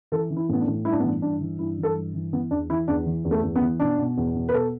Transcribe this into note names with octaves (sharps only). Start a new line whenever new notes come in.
E3 A4
E3
E4
A2 B3
D4
A2
G2 E4
D4
B3
E3 D4
G2 D4
E3
G2 E4
E3
A4
G2
E3
E3 B3
E2 D4
E3 E4
E2 D4
E3
E2
A3
E2
B3
E3
B2 D4
B2
E2
B2
B4
B2 A4